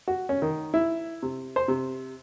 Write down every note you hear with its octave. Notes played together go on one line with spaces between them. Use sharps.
F#4
C#4
D#3
E4
C3
C5
C3